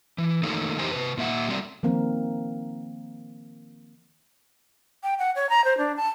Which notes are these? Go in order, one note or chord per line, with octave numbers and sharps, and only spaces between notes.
E3
D#3 A3 A#3 D#4 A4 C#5
E2 D#4 G4 C5 G#5
C3 D#3 B4
A#2 A#3 E5 F#5
F#3 G3 A3 C4 D5
D#3 F3 A#3 C4 A#4
G5
F#5
C#5
A#5
C5
D4
A5